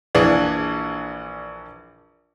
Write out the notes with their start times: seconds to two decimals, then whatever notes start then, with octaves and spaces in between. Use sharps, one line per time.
0.15 A#1 E3 D4 G#4